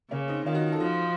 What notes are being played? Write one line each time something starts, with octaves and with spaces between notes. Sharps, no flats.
C#3 A#3 C#4
C4 D#4
D#3 C#4 F4
D#4 F#4
F4 A4
F3 D#4 F#4